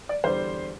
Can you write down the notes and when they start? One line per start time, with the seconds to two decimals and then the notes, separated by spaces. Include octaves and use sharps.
0.09 D5
0.24 E2 D3 G3 C5